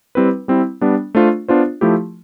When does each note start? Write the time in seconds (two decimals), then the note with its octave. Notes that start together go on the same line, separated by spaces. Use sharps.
0.15 G3 C4 E4 B4
0.48 G3 C4 E4
0.81 G3 B3 D4
1.15 A3 D4 F4 C5
1.48 B3 D4 F4 C5
1.81 F3 A3 E4 G4